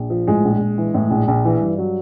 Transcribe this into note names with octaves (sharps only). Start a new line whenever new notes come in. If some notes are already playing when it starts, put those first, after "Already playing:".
Already playing: A#1
F3
A2 G#3
A#1
A#1
E3
A2
A#1
A#1
E3
G2
F#3